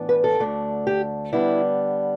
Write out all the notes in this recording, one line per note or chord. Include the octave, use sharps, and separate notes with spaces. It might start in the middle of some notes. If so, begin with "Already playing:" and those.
Already playing: A2 E3 B3 D4
B4
A4
D2 D3 A3 D4
G4
D3 G3 B3 D4 E4